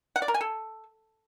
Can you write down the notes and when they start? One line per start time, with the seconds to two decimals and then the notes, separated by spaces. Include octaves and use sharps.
0.16 F#5
0.22 D5
0.28 A#4
0.34 G#5
0.41 A4